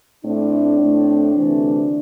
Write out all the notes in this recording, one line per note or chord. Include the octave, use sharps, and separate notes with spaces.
A2 A3 C4 D4
A2 A3 C4
D2 C3 E3 A3 C4